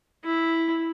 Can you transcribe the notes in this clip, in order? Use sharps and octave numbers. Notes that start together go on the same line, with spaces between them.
E4